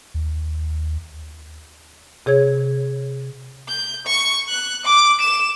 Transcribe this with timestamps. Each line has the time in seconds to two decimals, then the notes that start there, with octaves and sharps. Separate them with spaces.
0.14 D#2
2.26 C3 G#4 C#5 G#6
3.68 G6
4.07 C#6
4.49 F#6
4.85 D6
5.21 E7